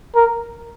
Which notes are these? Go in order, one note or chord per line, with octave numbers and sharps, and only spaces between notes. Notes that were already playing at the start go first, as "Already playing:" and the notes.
A#4